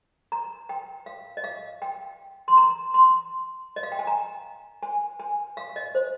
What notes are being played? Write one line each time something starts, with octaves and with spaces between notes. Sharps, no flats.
A#5
G5
F5
D#5
F5
G5
C6
A#5
C6
D#5
F5
G5
G#5
A#5
G#5
G#5
F5
D#5
C5